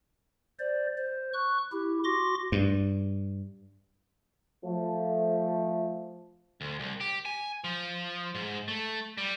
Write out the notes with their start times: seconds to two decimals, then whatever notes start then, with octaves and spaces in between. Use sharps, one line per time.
0.59 C5 D5
0.98 C5
1.34 C#6 F#6
1.72 E4 G4
2.04 F#4 C6 D6 A#6
2.52 G2
4.65 F3 A3
6.61 D2
6.80 C2
7.01 G4
7.25 G#5
7.64 F3
8.35 G#2
8.68 A3
9.18 G3